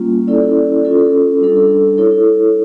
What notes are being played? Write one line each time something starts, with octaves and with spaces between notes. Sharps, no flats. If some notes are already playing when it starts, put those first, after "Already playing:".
Already playing: G3 A#3 C#4 F4
C#4 E4 A4 D5
C#4 F4 A4
G3 D4 A4
E4 A4 C#5